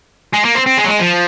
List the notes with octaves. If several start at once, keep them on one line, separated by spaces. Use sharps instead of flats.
G#3
A#3
C4
C4
G#3
F#3
G#3
F3